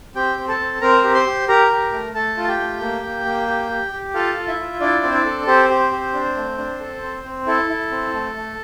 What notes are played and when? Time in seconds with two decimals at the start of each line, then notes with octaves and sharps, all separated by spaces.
0.15 C4 G4 G5
0.38 C4
0.48 A4 A5
0.59 C4
0.81 C4 A#4 A#5
1.04 G4
1.14 C5 C6
1.26 G4
1.48 G4 A#4 A#5
1.71 G4
1.93 A3
2.15 A3 A4 A5
2.37 F4
2.44 A5
2.48 G4 G5
2.59 A3
2.81 A#3
3.03 A#3
3.25 A#3
3.48 G4
3.70 G4
3.92 G4
4.14 F4 A4 F5
4.37 F4
4.48 E4 E5
4.59 F4
4.80 D4 E4 D5
5.03 C4 C5
5.13 D4 D5
5.25 A4
5.47 C4 G4 C5
5.70 G4
5.92 G4
6.14 D4
6.36 A3
6.58 D4
6.80 A4
7.02 C4
7.24 C4
7.47 E4 A4
7.69 E4
7.91 C4
8.13 A3
8.35 A3